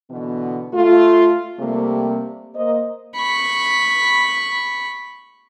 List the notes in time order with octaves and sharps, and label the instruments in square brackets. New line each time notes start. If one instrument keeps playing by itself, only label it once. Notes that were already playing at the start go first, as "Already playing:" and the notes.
[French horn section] B2 D3 E3 B3
A3 F4
C3 G3 A3 A#3
A#3 C5 D#5
[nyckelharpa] B5 C#6